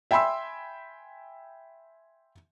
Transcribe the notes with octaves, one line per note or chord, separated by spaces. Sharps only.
E5 G5 G#5 B5 C6 E6